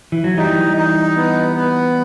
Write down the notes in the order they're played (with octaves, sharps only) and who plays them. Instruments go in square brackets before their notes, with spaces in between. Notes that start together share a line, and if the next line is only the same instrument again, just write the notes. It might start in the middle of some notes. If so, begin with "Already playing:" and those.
[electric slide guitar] E3
F#3
[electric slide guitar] E3 G3 [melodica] D#4
[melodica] D#4
B3
B3